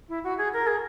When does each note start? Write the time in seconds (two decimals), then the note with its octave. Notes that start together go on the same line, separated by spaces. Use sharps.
0.09 E4
0.24 F#4
0.38 G#4
0.53 A#4
0.67 G#4